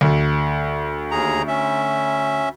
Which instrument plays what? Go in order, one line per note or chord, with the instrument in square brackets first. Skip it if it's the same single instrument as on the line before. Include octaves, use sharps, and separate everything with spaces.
[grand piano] D2
[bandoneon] D#2 G#4 A#5
C#4 E5